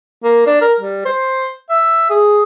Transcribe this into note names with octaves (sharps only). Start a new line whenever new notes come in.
A#3
D4
A#4
G3
C5
E5
G#4